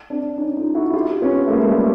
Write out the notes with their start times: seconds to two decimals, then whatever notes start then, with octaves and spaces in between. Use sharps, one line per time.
0.10 C4 D4
0.38 C#4 D#4
0.57 D#4 F4
0.75 E4 F#4
0.93 F4 G4
1.22 B3 C#4
1.46 A3
1.50 G#3 A#3
1.69 G3 A3